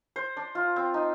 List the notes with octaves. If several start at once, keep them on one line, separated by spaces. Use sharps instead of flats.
C5
D4
F4
C4
D#4